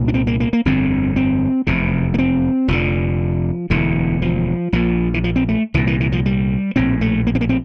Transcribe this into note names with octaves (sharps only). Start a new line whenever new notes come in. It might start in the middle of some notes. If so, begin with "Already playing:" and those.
Already playing: C2 A#2
D4
C4
A#3
A#3
A#3
G1 F2 D3 C4
C4
F1 E2 C3
A#3
C4
F1 F2 D3 F3
E1 D2 D3 E3
F3
A#1 A#2 F3
E3
F3
C4
A3
C2 A#2 E3
E3
E3
F3
G3
A#1 A2 C4
A3
A#3
C4
A#3
C4